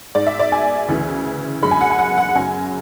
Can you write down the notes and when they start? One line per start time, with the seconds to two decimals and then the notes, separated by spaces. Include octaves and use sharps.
0.15 G#2 G#3 D5
0.27 E5
0.39 D5
0.52 G#5
0.88 D2 C#3 E3
1.62 F#2 D3 G#3 B5
1.71 G#5
1.81 F#5
1.90 G#5
1.99 F#5
2.18 F#5
2.35 F#2 C#3 F#3 G#5